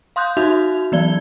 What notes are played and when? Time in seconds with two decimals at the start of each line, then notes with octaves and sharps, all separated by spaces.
0.16 F5 C6 D#6 F#6 G6
0.37 D#4 F#4 E5 F7
0.92 E3 F#3 B3 D5 G#6 G7